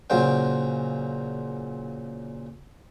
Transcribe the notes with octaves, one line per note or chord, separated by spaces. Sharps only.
A#2 C#3 F#3 C5 G5